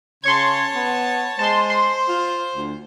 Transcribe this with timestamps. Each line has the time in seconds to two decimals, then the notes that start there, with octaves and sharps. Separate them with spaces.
0.24 C#3 C#5 A5 C6 C#6 G#6
0.75 B3
1.39 G#3 C5 A5 C6
1.70 C6
2.08 F4
2.54 D2